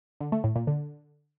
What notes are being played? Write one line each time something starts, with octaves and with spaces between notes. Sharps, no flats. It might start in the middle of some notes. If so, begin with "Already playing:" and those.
D3
A3
A2
A#2
D3